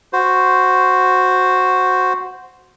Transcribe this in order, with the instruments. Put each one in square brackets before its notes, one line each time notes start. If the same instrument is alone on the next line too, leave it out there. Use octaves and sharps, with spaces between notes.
[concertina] F#4 C5